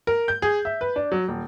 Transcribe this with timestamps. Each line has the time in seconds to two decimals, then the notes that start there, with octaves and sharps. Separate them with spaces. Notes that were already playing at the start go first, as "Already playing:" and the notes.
0.07 A#4
0.28 G6
0.42 G#4
0.65 E5
0.81 B4
0.96 D4
1.12 F#3
1.28 D#1